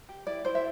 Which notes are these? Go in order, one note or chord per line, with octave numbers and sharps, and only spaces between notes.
G4
E4 D5
E4 C5
E5